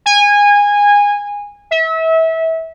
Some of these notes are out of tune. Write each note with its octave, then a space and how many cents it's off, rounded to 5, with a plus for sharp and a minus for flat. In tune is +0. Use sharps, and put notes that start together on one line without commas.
G#5 -20
E5 -30